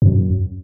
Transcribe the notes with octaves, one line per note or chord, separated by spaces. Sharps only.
F#2